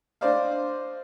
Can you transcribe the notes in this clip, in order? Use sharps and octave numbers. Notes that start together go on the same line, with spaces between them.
D4 C5 D5 D#5 F5